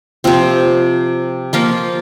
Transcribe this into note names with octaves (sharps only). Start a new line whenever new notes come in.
C3 F3 C4
F3 A#3 F4 A#4